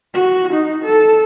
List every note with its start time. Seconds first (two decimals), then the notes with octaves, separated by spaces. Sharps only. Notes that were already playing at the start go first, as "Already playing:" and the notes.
0.14 F#4
0.53 D#4
0.85 A4